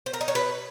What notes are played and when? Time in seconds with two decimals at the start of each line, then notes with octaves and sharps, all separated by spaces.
0.06 C5
0.13 A#4
0.21 D#4
0.28 C#5
0.35 B4